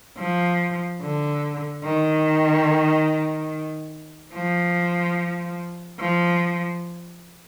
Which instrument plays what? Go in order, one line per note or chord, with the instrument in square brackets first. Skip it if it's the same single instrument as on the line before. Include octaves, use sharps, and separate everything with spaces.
[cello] F3
D3
D#3
F3
F3